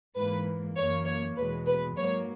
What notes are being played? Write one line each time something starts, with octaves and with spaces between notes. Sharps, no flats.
G#2 E3 A#3 B4
F#2 E3 A#3 C#5
C#5
E2 B2 G#3 B4
B4
G#2 F#3 A#3 C#5